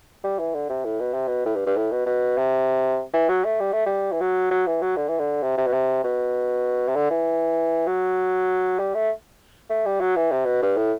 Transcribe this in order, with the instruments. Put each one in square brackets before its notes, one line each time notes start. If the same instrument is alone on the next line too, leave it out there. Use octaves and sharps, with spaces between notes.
[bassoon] G3
E3
D3
C3
A2
B2
C3
B2
A2
G2
G2
A2
B2
B2
C3
E3
F#3
A3
G3
A3
G3
E3
F#3
F#3
E3
F#3
D3
E3
D3
C3
C3
B2
C3
B2
C3
D3
E3
F#3
G3
A3
A3
G3
F#3
E3
C3
B2
G2
A2